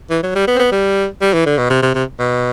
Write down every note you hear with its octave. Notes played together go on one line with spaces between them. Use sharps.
E3
F#3
G3
B3
C4
B3
G3
G3
E3
D3
B2
C3
C3
C3
B2